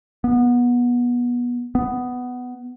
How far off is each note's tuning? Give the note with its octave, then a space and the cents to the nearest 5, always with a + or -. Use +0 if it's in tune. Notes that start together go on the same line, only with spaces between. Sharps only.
B3 -25
B3 +10